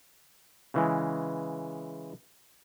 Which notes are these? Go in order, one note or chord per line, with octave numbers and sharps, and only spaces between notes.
C#3 E3 G#3